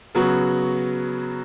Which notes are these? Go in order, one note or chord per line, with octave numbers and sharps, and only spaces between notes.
C#3 F#3 B3 F#4